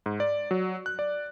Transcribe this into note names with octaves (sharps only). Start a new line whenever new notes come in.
G#2
D5
F#3
F#6
D5